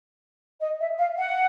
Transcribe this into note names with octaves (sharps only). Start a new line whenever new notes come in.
D#5
E5
F5
F#5